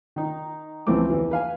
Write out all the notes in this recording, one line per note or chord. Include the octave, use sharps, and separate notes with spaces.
D#3 D#4
C#2 E3 F3 A3 C4 D6
E2 E3
B4 F5 G#5